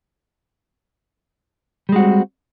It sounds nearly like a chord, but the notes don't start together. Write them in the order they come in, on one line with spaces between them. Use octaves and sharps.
G3 G#3 F#4 C4